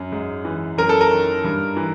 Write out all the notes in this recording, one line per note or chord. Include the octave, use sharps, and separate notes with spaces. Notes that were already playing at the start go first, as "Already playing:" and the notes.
Already playing: F#2
G#2
E3
F#2 A#4
A4
A#4
D#3
G2
E3